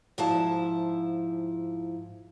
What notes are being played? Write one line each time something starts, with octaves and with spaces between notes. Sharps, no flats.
G#2 F3 E4 A5